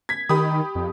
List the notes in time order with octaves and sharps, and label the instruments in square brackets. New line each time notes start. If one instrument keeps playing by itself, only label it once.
[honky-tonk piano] G#6 B6
[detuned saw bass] D#3 [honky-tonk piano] G4 B5 D#6
[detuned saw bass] F2